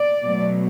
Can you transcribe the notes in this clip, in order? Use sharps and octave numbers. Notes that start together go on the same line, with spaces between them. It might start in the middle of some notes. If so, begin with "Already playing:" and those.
Already playing: D5
B2 F#3 A3